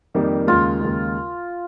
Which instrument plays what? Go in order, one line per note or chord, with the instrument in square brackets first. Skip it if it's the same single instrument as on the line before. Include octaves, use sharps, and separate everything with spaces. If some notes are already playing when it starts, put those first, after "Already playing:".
[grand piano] F2 D#3 G3 A#3 D#4
[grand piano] D#2 C#3 G#3 [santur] F4
[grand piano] D#2 C#3 G#3